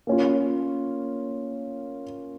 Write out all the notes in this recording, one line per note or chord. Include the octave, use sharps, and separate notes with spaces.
A#3 C#4 F4